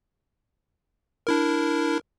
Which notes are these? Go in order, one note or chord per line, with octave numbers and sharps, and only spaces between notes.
D4 E4 A#4